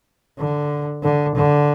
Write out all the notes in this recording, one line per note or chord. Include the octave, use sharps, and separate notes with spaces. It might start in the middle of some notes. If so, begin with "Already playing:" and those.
D3
D3
D3